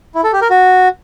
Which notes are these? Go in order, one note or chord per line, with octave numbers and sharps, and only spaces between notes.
E4
A4
G4
A#4
F#4